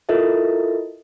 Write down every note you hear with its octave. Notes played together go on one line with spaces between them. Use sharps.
E4 F4 A4 A#4 D#5 E5